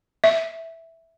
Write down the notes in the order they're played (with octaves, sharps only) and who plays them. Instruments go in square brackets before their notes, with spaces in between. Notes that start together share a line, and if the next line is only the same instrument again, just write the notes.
[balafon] E5